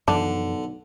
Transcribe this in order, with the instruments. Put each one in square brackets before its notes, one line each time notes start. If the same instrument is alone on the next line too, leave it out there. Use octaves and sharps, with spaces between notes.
[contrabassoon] B1 [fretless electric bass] F#2 E3 F3 [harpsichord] D3 [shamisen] D4